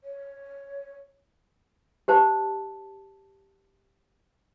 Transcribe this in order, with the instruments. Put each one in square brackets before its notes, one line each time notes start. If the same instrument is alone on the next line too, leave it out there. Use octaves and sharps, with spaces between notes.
[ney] C#5
[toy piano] G4 C5 A5